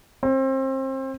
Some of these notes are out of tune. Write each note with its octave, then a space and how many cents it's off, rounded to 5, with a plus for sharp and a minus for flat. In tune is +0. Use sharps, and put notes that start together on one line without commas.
C4 +30